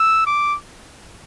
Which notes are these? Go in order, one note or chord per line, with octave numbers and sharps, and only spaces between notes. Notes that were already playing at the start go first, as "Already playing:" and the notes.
Already playing: E6
D6